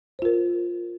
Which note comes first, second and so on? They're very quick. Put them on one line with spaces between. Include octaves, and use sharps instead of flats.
C5 F4 A#4